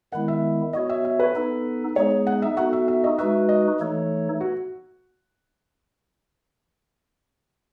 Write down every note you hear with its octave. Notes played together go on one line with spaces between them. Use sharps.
D#3 G#3 B3 E4 F#5
E5
B3 F#4 C#5 D#5
E5
E5
B4
B3 D#4 A4
G#3 B3 D#4 G#4 C#5
F#5
E5
B3 D#4 F#4 A4 F#5
E5
E5
D#5
G#3 D#4 F#4 B4 E5
D#5
E3 A3 D#4 A4 C#5
F#4